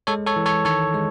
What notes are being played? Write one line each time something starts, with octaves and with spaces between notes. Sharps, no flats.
G#3 A4 C#5
A4 C#5
E3
A4 C#5
D#3 A4 C#5
G#3